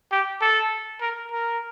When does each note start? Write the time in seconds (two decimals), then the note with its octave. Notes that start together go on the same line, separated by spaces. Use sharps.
0.12 G4
0.41 A4
1.01 A#4
1.32 A#4